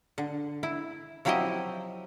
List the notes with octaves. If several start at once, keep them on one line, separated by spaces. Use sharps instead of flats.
D3
E4
F3 F#3 C4 E4 G4 D#5